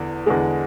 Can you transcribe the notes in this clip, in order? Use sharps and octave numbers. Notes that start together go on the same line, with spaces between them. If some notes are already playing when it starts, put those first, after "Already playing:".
Already playing: E2 D3
E2 D3 G#3